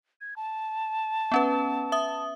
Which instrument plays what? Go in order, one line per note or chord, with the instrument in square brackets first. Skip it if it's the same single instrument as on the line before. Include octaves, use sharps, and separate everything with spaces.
[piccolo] G#6
A5
[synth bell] B3 C#4 B4
E5 D#6